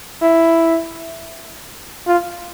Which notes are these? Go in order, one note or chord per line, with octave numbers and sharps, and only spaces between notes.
E4
F4